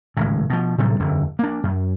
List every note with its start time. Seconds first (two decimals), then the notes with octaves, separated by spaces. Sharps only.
0.17 G#1 C#2 A2
0.50 B2 F3
0.78 A2 C3 F#3 G3
1.00 E1 F#2 D3
1.39 A#3 D4
1.63 F#2